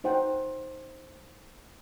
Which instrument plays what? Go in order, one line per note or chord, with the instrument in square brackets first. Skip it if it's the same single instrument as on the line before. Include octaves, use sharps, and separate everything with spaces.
[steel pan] D#4 C5 F#5 G5